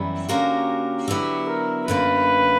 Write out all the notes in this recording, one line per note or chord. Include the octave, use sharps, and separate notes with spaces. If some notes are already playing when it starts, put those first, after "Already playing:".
Already playing: F#2 E3 G3 B3 E4
D3 A#3 C#4 F#4 G4 A#4
D3 F#3 B3 E4 G4
A#4
F#2 D3 A#3 B4